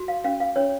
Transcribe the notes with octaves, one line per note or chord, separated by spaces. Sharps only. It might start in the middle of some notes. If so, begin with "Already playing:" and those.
Already playing: F#4
F5
C#4 F5
F5
C#4 C#5